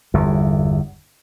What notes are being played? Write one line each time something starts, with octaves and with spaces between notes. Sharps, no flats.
G1 E2